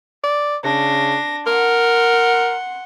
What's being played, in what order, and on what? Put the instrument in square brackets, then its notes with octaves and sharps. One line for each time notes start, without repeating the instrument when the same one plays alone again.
[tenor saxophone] D5
[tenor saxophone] C#3 [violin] D4 A#6
[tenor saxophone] A#4 [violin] F#5 C6